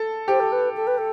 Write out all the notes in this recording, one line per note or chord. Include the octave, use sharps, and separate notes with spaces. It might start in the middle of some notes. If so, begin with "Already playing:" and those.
Already playing: A4
G4 C5
A4
B4
A4
B4
A4